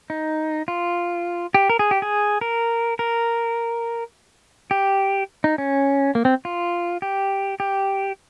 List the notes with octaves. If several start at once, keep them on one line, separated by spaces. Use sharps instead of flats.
D#4
F4
G4
A#4
G#4
G4
G#4
A#4
A#4
G4
D#4
C#4
A#3
C4
F4
G4
G4